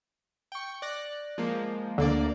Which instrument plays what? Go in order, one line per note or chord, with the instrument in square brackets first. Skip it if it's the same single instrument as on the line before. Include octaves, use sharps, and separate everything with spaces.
[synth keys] G5 C#6
D5 F#6 A#6
F3 G#3 A#3
[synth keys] D2 A#3 D5 [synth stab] D3